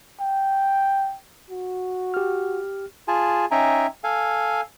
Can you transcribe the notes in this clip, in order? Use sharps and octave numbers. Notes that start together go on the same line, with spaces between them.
G5
F#4
G4 F6
F4 G#4 G#5 A5
C#4 D#4 E5 G5 G#5 A#5
A4 F5 G#5